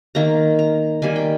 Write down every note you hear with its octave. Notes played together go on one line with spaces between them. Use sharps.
D#3 A#3 A#5
A#5
D#3 G3 A#3 G#5
G5